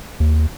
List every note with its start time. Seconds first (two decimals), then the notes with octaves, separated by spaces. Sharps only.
0.20 D#2